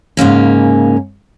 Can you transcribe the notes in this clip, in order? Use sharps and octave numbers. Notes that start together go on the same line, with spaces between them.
G#2 C#3 A#3 C#4